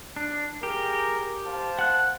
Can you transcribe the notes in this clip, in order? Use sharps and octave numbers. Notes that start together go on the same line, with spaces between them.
D4
G4 G#4 A#4
C5 F5 A5
F#5 F#6